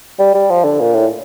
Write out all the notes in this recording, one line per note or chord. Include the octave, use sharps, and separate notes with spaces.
G3
G3
F3
D3
A#2
A2